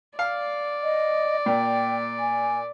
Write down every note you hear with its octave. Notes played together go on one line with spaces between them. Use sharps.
D5 F5
D#5
A#2 G5
G#5